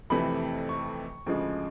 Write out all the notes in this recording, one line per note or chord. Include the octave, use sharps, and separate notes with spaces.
F2 C3 E3 A3 B5
C#6
D2 C#3 F3 G#3